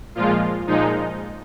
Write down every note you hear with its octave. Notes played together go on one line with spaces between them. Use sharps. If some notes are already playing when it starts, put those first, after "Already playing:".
A#2 F3 G#3 F4
A#2 F3 G#3 D#4